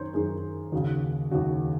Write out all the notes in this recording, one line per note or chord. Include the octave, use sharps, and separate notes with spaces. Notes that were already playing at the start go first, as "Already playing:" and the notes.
Already playing: F#2 D#3 C5 C#5
F#2 D#3 G#4
D#2 C#3 F#4
D#2 C#3 F#4